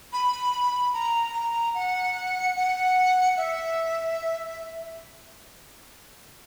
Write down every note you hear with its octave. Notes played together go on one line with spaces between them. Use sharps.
B5
A#5
A#5
F#5
F#5
E5